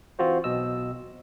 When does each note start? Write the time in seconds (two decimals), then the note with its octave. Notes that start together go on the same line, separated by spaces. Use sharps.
0.19 E3 C4 F4 F#4 C5
0.44 B1 B2 D#5 E6